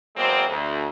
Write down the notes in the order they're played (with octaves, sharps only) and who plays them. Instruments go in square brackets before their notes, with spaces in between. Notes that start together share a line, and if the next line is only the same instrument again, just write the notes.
[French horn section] E2 F#3 G#3 A#3 C4
D2